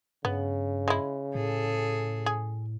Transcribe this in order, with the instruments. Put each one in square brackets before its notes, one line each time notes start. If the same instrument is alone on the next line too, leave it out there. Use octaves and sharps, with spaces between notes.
[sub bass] G2 [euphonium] C#3 [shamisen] B3
[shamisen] G#3 E4
[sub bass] A2 [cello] G#4 A4
[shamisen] G#4